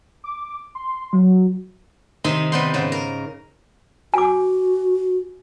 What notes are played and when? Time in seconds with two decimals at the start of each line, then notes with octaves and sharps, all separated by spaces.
0.24 D6
0.75 C6
1.13 F#3
2.24 C3 D#3 D#4 D#5 E5 C6
2.52 C3 G3 B3 G5 C6
2.74 G#2 C#3 B3
2.92 A#4
4.14 F#4 G#5 D6